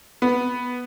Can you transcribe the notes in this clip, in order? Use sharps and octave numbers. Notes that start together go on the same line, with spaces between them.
B3